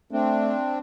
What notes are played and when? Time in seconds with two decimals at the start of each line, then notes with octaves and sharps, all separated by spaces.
0.12 A3 C4 D4